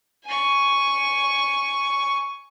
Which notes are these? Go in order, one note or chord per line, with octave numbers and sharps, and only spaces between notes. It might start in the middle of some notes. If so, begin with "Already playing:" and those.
G#5 C#6